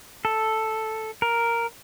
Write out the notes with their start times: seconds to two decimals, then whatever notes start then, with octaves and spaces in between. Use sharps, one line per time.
0.25 A4
1.22 A#4